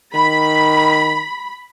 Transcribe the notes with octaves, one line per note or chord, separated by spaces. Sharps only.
D#3 B5